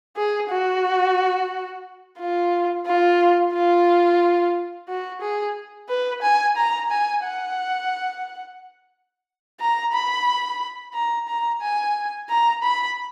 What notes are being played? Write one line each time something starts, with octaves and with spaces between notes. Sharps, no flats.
G#4
F#4
F4
F4
F4
F#4
G#4
B4
G#5
A#5
G#5
F#5
A#5
B5
A#5
A#5
G#5
A#5
B5